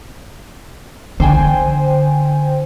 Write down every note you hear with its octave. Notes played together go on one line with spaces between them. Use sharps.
D3 C5 G5 G#5